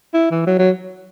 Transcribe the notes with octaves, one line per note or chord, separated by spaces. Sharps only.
E4
E3
F#3
F#3